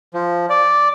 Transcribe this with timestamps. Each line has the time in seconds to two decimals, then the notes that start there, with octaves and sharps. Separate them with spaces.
0.14 F3
0.50 D5